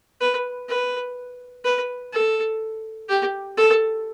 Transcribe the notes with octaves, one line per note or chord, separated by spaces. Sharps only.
B4
B4
B4
A4
G4
A4